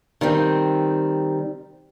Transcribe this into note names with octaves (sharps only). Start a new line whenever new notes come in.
D#3 G3 C4